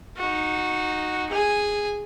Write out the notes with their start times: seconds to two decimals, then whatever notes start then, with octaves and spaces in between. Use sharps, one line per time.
0.17 D#4 F#4
1.29 G#4 G#5